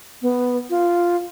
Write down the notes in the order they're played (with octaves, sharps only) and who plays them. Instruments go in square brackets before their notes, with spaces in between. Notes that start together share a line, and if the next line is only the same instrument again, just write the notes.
[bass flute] B3
F4